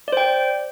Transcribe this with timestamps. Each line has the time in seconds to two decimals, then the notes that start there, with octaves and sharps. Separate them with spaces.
0.08 D5
0.12 C5
0.17 G5